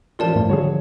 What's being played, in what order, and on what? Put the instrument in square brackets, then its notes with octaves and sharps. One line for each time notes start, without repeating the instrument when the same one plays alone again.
[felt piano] A1 F3 [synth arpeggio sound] F4 A4 [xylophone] A#4 D5 A5
[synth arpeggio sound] G#2 A3 E4
[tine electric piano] D3 F3 [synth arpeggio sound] G3 F#4 G#4 [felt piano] C#5